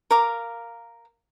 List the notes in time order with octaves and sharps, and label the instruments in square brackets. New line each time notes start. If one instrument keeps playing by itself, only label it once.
[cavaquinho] A#4 F5 D6